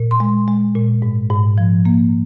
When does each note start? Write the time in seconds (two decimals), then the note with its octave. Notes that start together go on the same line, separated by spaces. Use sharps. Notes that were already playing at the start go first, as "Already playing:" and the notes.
Already playing: A#2
0.11 C6
0.20 G#3
0.48 G#3
0.75 A#2
1.02 G#2
1.30 G#2
1.58 F3
1.85 A#3